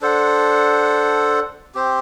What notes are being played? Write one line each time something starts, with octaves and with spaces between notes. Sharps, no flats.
D4 A4 C5 F#5
C4 G4 C5